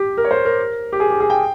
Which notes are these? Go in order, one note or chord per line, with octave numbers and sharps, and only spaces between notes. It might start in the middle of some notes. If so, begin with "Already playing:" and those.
Already playing: G4
A#4
C#5
C5
A#4
G4
G#4
G4
G#4
G5